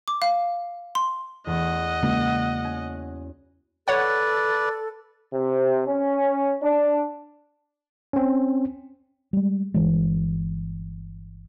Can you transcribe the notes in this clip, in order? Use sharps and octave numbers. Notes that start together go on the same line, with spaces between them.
D6
F5
C6
E2 A3 B3 D#5 F#5
C#3 G#3 A#3 F#4
C#4 G#5 A#6
A4 B4 C#5 D5 F#5
C3
C#4
D4
C4 C#4
G3 G#3
G1 E3 G#3